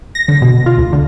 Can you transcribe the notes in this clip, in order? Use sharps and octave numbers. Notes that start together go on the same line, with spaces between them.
A#6
D3
B2
F4
D2
D3